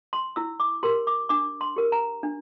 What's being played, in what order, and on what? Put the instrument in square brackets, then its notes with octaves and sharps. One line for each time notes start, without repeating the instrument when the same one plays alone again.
[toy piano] C6
E4 E6
D6
G4 A#4 C6
D6
D4 D6
C6
G4 A#4
A#5
D4